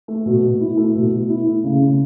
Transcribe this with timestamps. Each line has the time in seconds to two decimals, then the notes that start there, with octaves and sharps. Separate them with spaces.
0.08 A3
0.26 B2
0.43 B2
0.60 E4
0.77 A3
0.95 B2
1.12 B2
1.29 E4
1.46 A3
1.64 C#3
1.81 C#3